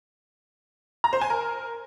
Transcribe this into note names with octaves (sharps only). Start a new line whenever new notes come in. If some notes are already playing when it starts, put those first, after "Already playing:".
A#5
C5
G#5
A#4